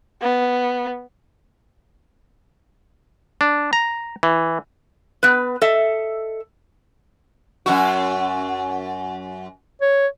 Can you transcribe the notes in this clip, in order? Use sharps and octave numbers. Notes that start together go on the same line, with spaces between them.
B3
D4
A#5
E3
B3 B4
A4 D#5 E5
F#2 A#2 F#4
C#5